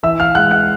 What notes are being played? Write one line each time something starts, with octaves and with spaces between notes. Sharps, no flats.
E3 E5 E6
F5 F6
G#3 F#5 F#6
F#5 F#6